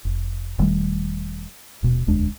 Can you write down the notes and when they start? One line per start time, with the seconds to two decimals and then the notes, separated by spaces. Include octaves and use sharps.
0.05 F1
0.59 E1 D#3 G3 A3
1.83 D#1 B2
2.07 E1 D2 G#3 D4